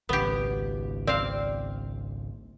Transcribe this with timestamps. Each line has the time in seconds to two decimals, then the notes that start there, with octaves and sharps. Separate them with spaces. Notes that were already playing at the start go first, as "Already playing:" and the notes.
0.09 G#1 C#2 B3 G4
1.07 C4 D5 F5